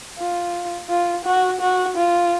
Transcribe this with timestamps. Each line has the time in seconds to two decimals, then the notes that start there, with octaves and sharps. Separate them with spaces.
0.18 F4
0.89 F4
1.25 F#4
1.61 F#4
1.96 F4